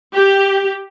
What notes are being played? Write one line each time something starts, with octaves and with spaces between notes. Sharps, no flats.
G4